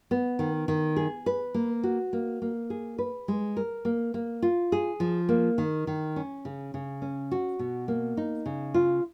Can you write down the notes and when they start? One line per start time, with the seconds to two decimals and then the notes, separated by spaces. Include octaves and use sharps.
0.11 B3
0.39 D#3
0.68 D#3
0.96 G#4
1.26 B4
1.54 A#3
1.84 F#4
2.13 A#3
2.42 A#3
2.70 G#4
2.99 B4
3.28 G#3
3.57 A#4
3.85 A#3
4.14 A#3
4.42 F4
4.72 G#4
5.00 F3
5.29 A#3
5.58 D#3
5.87 D#3
6.16 C#4
6.45 C#3
6.74 C#3
7.02 C#4
7.31 F#4
7.59 B2
7.88 A#3
8.17 D#4
8.46 C#3
8.74 F4